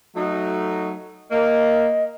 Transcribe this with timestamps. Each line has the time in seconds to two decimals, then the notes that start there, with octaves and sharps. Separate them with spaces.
0.15 F#3 A3 D#4
1.31 A#3 D#5